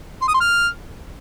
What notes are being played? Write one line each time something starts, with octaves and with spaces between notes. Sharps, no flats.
C6
D#6
C6
F6